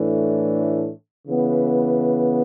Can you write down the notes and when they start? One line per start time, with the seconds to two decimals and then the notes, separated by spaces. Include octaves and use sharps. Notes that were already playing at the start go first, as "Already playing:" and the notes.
Already playing: A2 E3 A3 D4
1.27 C#3 E3 B3